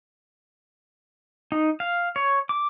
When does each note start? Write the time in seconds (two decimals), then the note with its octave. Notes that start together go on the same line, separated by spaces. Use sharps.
1.52 D#4
1.80 F5
2.16 C#5
2.49 D6